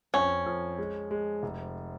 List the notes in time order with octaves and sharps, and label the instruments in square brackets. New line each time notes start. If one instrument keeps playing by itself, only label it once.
[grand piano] F2 [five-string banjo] C#4
[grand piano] F2
G#3
G#3
F1